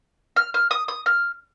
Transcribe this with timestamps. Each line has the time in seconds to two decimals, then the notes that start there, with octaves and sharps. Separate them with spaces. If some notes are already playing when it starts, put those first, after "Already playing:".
0.36 F6
0.54 F6
0.71 D#6
0.88 D#6
1.06 F6